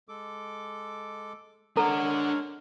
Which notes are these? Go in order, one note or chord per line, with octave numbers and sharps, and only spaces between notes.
G#3 A4 D6
G#3 D4 A4 A#4 C#5 F#5 A#5